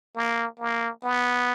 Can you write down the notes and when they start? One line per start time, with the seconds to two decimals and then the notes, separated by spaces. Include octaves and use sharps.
0.16 A#3
0.59 A#3
1.04 B3